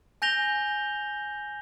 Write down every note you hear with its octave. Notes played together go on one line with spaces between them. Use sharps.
G#5 G6 A#6 F7 G7